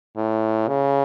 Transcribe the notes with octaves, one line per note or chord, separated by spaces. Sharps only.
A2
C#3